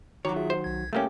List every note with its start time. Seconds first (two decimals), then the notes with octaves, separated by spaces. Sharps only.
0.25 D#3 F#3 F#4 C#5 A#5 D6
0.36 F4 G#4 E5
0.50 C5
0.64 B1 G#6
0.93 C2 A3 A#3 C#4 G4